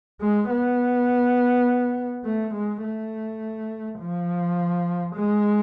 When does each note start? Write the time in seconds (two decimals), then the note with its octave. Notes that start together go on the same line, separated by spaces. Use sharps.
0.21 G#3
0.50 B3
2.25 A3
2.53 G#3
2.83 A3
3.99 F3
5.15 G#3